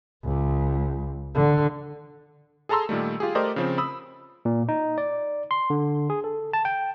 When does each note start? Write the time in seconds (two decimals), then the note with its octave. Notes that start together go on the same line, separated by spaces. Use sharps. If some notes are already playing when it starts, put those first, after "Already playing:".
0.25 C#2
1.35 D3
2.69 G#4 A4 A5 A#5 C6 E6
2.89 A#2 D#3 G3 A3
3.20 F4 G4 G#4
3.35 A3 G4 A#4 C5 D5 D#5
3.56 C#3 F3 C4
3.78 B5 D#6 E6
4.45 A#2
4.69 D#4
4.98 D5
5.51 C6
5.70 D3
6.10 G#4
6.24 A4
6.53 A5
6.65 G5